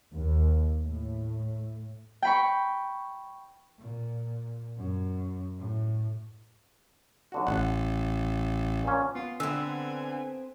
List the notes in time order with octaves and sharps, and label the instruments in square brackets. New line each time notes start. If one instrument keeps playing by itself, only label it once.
[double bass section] D#2
A2
[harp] G5 B5 C#6
[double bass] A#2
F#2
A2
[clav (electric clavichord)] B1 D3 F#4
[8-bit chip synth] A1 [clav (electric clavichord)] F#5
[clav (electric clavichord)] A#2 C#4
[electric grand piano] B3 [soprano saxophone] F4
[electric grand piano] D3 [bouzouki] B3 C4 [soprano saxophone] G#5 [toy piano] E6